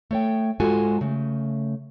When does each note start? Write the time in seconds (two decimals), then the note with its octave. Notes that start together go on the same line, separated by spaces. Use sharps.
0.11 A3 C#5 G5
0.60 G#2 G#3 F4 F#4 A4 G#5
1.01 C#3 A3